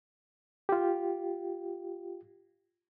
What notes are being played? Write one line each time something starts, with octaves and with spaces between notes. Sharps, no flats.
F4 G4